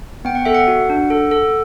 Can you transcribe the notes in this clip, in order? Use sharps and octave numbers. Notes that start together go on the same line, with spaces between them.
B3 G5
F#5
A4 E5
F#5
F#4
D4
A4
A4